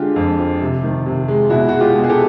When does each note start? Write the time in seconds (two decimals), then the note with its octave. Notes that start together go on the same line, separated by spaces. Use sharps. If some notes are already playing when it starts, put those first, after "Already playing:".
Already playing: D3 G#3 F4 G4
0.16 F2
0.38 F3
0.61 C3
0.83 D#3
1.06 C3
1.28 G#3
1.50 B2 E4 F#4
1.69 G#3 F#4
1.80 F4 G4
1.95 B2
2.04 G#4
2.09 G4 A4